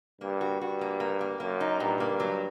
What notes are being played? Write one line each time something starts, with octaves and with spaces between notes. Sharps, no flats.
G2 A#3
F#4
G2 F#4
A#3
A#3
A#3
F#2 A#3
D#4
G2 A#2
A#3
F#3